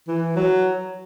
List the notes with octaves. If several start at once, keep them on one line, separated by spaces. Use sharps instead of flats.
E3
F#3